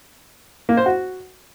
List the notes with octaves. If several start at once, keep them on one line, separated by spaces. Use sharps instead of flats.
A#3
C5
F#4